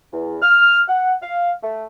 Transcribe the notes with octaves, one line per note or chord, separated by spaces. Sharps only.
E2
F6
F#5
F5
A3